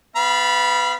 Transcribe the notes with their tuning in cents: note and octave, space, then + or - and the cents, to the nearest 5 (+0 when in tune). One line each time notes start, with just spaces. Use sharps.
B3 +25 F5 -30 B5 -20